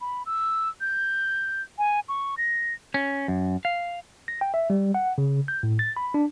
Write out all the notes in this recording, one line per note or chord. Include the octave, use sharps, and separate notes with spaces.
B5
E6
G6
G#5
C#6
A#6
C#4
F#2
F5
A#6
G5
E5
G3
F#5
C#3
G6
A2
A6
B5
D4